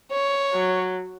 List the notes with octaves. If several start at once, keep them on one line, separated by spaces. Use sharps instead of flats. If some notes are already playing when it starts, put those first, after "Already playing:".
C#5
F#3